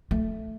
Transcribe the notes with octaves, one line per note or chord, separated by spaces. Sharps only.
A3